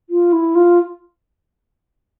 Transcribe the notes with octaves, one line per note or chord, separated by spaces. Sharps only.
F4
E4
F4